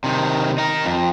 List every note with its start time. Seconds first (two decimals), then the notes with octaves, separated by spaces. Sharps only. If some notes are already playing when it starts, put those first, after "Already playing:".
0.04 C3 D#3
0.58 D#4 A#4
0.85 F2